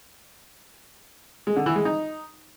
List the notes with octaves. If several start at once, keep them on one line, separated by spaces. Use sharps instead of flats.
G#3
D3
E3
G#3
D#4